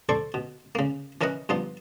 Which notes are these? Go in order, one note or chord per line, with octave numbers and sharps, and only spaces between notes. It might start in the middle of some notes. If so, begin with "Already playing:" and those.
A4 C5 D5 C#6
B2
C#3 A#3
E3 C#4 A#4 B4 D#5 F#5
G2 F3 B3 D#4